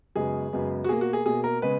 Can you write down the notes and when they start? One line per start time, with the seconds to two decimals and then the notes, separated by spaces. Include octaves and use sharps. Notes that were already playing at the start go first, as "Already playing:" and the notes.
0.16 F#2 C#3 G#3 B3 G#4
0.53 F#2 C#3 G#3 B3
0.84 F#4
0.89 B2 A#3 G#4
1.01 F#4
1.13 G#4
1.26 B2 A#3 G#4
1.44 A#4
1.62 C#3 G#3 B3 B4